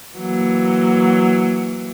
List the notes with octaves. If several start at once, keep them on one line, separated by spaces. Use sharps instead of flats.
E3 F#3 A#3